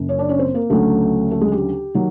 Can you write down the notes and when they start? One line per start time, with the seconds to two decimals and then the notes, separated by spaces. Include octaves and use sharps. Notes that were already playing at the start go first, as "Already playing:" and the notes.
Already playing: F#1 F#2 C#3
0.09 C#4 C#5
0.19 D4 D5
0.29 C#4 C#5
0.39 C4 C5
0.54 A#3 A#4
0.70 D2 C#3 F#3 A3 A4
1.31 A3 A4
1.41 G#3 G#4
1.52 G4
1.94 D#3 F#3